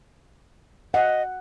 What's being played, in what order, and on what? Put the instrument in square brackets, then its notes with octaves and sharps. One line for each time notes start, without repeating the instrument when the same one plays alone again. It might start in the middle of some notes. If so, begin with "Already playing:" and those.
[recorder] D#5 [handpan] F#5